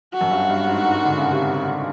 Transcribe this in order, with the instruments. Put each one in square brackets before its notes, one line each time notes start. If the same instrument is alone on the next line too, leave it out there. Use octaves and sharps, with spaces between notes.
[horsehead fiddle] F#4
[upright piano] F#2
G2
G2
G#2
G#2
D3
C#3
C3